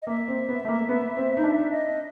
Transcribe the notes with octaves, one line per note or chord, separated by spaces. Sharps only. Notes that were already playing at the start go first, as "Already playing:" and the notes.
D#5
A#3 E5
C4
B3
A3
A#3
B3
C4
D#4
D4
D#5